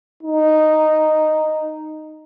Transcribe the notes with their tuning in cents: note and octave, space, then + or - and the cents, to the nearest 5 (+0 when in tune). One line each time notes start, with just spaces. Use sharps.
D#4 -5